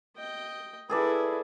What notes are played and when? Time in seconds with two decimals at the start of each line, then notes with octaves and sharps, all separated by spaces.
0.16 D#5 G5
0.90 E4 G#4 A4 B4 D5